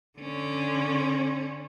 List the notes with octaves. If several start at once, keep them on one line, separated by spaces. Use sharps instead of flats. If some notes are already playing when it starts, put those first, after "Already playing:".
D3 C#4